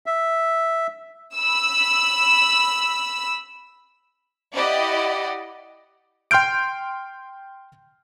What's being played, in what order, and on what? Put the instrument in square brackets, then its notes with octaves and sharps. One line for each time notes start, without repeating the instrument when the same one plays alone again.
[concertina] E5
[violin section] B5 E6
E4 G4 D5 D#5 F#5
[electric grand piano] G5 C6 F6 G6 D7